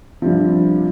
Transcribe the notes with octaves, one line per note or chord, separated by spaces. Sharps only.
G2 C3 F3